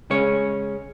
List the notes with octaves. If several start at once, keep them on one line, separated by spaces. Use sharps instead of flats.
C#3 G#3 C#4 C#5